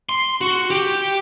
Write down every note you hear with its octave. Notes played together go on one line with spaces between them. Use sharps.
C6
F#4
G4